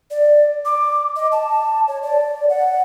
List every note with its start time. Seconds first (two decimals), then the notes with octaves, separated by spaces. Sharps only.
0.10 D5
0.65 D6
1.16 D#5
1.32 A5
1.88 C#5
2.02 D5
2.49 F#5